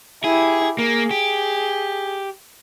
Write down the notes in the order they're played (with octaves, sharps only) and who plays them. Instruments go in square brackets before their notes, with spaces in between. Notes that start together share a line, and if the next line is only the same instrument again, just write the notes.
[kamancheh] E4 G4 [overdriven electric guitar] G#4
[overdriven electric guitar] A#3 [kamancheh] G#4
[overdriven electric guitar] G4